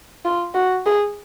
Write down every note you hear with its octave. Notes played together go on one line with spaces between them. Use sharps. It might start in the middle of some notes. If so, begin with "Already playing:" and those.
F4
F#4
G#4